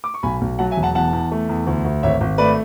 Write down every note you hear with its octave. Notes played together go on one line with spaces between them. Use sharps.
D6
C#6
B1 G#5 B5
B1
F#3 F#5 A5
E5 G#5
E1
F#5 A5
E2 F#5 A5
E2
A3
E2
D2
D2
G#1 C#5 E5
G#1
A3 B4 D5